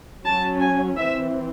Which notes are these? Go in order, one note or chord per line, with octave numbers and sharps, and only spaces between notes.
F#3 C#4 A5
G#5
E3 C4 E5